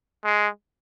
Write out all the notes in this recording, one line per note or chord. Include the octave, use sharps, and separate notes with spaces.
G#3